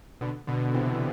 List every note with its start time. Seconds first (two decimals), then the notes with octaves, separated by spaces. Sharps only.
0.21 B2 D3
0.47 B2 D3
0.74 C3 E3